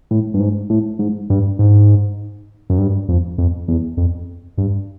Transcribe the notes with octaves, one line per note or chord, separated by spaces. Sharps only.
A2
G2
G#2
A2
G#2
G2
G#2
F#2
G2
F2
F2
E2
F2
G2